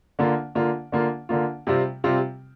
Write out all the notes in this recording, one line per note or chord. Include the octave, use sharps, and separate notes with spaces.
D3 A#3 F4
D3 A#3 F4
D3 A#3 F4
D3 A#3 F4
C3 G3 C4 F4
C3 G3 C4 F4